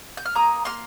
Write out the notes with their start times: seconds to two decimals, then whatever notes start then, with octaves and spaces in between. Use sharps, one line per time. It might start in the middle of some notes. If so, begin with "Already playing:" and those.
0.17 G6
0.25 F6
0.35 A#3 A#5 D#6
0.65 A#3 C6 F6